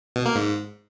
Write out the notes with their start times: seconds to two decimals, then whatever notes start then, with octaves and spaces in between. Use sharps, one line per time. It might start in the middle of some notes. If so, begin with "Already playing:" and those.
0.16 B2
0.26 A#3
0.35 G#2